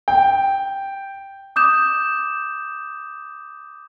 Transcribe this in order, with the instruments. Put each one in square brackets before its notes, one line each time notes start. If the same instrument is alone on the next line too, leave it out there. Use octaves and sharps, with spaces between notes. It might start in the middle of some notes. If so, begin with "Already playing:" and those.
[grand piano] G5
[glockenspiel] D6 D#6 G6 E7